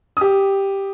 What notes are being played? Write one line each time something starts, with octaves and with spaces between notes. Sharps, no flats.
G4 D#6